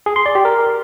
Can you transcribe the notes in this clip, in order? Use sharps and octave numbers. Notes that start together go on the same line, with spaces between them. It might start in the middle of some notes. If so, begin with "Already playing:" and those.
G#4
C6
D5
G4
A#4